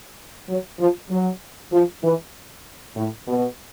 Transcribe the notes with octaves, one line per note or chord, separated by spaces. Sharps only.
F#3
F3
F#3
F3
E3
A2
B2